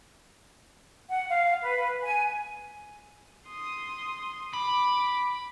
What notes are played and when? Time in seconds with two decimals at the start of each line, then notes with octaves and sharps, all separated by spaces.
1.10 F#5
1.30 F5
1.61 B4
2.03 G#5
3.48 C6 D#6
4.53 B5 D6